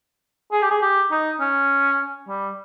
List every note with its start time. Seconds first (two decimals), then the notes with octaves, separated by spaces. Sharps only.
0.52 G#4
0.62 G4
0.70 G#4
0.82 G4
1.11 D#4
1.40 C#4
2.29 G3